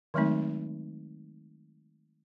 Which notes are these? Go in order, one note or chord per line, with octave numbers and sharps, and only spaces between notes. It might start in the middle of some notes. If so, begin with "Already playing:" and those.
D#3 F#3 G#3 A3 C4 D#4